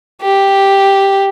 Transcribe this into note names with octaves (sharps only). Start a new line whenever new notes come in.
G4